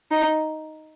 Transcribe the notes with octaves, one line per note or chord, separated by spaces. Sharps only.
D#4